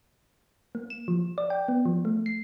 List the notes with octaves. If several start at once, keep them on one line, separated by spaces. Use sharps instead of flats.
A#3
E7
F3
D5
G5
B3
F3
A3
C7